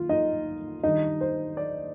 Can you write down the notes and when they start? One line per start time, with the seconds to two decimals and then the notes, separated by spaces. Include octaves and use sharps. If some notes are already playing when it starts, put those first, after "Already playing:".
Already playing: D#3 A#3 F4
0.09 D#4 D#5
0.83 D#3 G3 D4 D#4 D#5
1.21 C5
1.57 D5